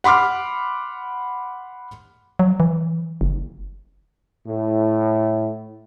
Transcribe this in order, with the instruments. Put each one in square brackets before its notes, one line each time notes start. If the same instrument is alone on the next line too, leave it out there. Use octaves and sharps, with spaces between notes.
[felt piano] F#5 B5 C6 D6 F6
[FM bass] F#3
E3
F#1
[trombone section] A2